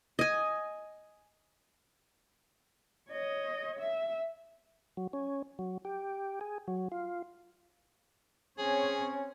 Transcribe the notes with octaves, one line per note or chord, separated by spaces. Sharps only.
D#5 G#5
C#5 D#5
E5
F#3
C#4
F#3
G4
G#4
F#3
F4
C4 C#4 G#4 C#5